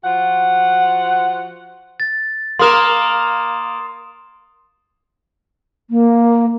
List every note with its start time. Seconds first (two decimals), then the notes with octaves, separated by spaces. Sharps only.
0.03 F3 F#4 F#5
2.00 A6
2.59 A#3 A#4 C6 D#6 E7
5.90 A#3